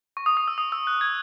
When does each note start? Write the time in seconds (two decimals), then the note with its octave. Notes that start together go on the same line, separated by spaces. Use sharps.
0.17 C#6
0.26 D#6
0.37 D#6
0.48 E6
0.58 D#6
0.72 E6
0.87 F#6
1.01 G#6